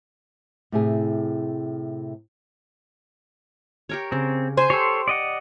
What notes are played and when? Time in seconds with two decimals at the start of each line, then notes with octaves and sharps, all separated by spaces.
0.72 A2 C3 G#4
3.89 G4 A#4 C#5
4.12 C#3 C4
4.57 C5 G#5 C6
4.70 G4 A4 C#5
5.08 D5 D#5 F#5